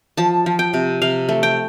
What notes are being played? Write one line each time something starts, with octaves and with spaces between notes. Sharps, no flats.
F3 A5
F3
G5
C3
C3 F5
A3
G5